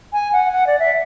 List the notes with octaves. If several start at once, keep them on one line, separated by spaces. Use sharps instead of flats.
G#5
F#5
F#5
D5
E5